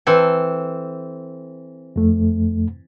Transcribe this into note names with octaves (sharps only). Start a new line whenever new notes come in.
E3 C4 A4
F2 A3